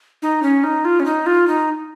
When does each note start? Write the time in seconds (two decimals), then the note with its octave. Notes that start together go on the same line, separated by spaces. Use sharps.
0.22 D#4
0.43 C#4
0.64 D#4
0.85 F4
1.00 C#4
1.06 D#4
1.26 F4
1.47 D#4